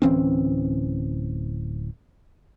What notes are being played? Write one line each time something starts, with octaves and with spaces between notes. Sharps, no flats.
D1 E3 C4 C#4